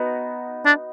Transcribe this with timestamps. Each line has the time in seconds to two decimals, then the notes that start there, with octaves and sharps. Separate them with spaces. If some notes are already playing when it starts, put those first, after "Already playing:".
Already playing: B3 D#4 F#4
0.66 D4